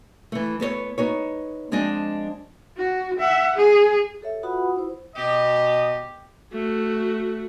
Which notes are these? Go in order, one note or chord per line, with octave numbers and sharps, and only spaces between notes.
E3 A3
B3 A4 B4 C#5
B3 D#4 C#5
F3 G#3 C4 D4 D#5
F#4
E5 F#5
G#4
G4 A4 C#5 E5
F4 F#4 B4 F#5 B5 D#6
E4 C5
B2 G4 D#5
A3 F#4